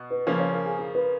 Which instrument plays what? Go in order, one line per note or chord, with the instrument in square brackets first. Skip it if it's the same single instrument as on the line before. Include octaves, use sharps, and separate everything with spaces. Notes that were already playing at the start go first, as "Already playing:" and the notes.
Already playing: [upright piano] B2
[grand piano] B4
[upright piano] C#3 F3 A#3 C#4 [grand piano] B4
[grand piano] C#5
A#4
G#4
A#4
B4